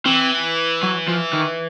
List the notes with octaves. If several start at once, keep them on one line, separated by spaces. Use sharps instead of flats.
E3 C4
F#3
F3
D#3